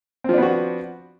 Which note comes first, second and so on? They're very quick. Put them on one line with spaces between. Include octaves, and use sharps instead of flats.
C4 F3 D4 B3 F#4